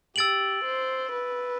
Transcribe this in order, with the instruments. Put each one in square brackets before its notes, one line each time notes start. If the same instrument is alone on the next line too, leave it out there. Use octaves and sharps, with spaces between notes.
[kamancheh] G4 [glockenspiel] E6 A6 D7 F#7
[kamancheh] C5
B4